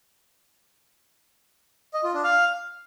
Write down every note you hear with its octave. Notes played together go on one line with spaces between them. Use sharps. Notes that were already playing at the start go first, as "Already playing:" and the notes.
D#5
F4
D4
F5